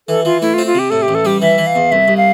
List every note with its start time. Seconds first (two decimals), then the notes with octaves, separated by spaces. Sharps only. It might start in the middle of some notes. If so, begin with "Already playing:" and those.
0.08 E3 A4
0.25 E3 F4
0.42 A3 E4
0.54 F4
0.58 C4
0.66 F4
0.75 C3 G4
0.90 A2 A4
1.02 G4
1.08 A1
1.15 A4
1.25 G3 G4
1.42 E3 E5
1.58 E3
1.67 F5
1.75 E2
1.92 C2 E5
2.08 C2
2.17 F5